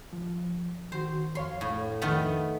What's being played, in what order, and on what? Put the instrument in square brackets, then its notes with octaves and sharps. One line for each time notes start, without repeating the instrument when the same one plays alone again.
[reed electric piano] F3
[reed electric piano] D#3 F#4 [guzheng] C5
[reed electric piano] F2 C#5 F5 [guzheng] C6
[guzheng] A2
[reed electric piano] F2 A4 [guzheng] D#3 A3 B3